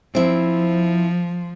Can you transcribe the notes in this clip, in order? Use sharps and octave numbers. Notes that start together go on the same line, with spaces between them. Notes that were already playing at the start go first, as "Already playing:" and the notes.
F3 C4 E4